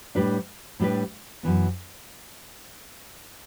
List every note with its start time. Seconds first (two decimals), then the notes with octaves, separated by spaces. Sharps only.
0.15 A2 G3 D4 G4 B4
0.80 A2 G3 D4 G4 B4
1.43 F#2 E3 B3